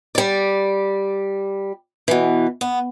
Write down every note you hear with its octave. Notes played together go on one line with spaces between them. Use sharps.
G3 D5
B2 E3
B3